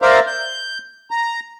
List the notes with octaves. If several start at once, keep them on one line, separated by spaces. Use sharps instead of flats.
A#4 C5 D5 E5 F5 A#5
G6
A#5